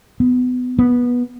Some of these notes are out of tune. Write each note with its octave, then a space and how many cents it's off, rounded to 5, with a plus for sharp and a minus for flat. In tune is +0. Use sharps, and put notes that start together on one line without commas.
B3 +25
B3 -15